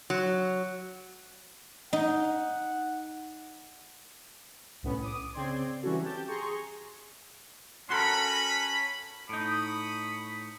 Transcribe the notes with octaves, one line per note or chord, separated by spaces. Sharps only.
F#3
D#4 F#5
C2 A2 B3 C#4 B5
D6 D#6
C#3 C4 D5 C6 G#6
E3 G3 C#4 E4 F#4 A4
G4 A5 G6
G#4 A#5 C6 C#6
C#4 F#4 A4 A#4 B5
A2 D#4 B5 C#6 D#6